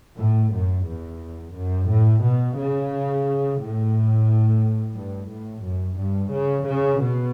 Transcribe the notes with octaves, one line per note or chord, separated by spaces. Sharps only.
A2
F#2
E2
F#2
A2
B2
C#3
A2
G2
A2
F#2
G2
C#3
C#3
B2